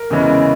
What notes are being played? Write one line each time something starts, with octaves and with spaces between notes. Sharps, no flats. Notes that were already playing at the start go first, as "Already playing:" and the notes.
Already playing: A#4
E2 C#3 E3 G#3 C#4